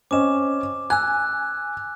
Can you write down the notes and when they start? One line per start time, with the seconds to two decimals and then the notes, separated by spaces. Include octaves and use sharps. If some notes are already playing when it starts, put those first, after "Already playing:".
0.11 C4 C#4 D#5 D6 E7
0.90 G#5 E6 F#6